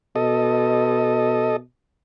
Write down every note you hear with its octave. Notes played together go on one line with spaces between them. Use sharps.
B2 A4 D#5